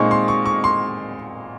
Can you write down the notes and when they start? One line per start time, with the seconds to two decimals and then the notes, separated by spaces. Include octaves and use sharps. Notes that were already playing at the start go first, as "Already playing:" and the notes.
Already playing: A#2 G#3 C4 D#4 C6 C#6
0.11 C6
0.28 C#6
0.46 C#6
0.64 C6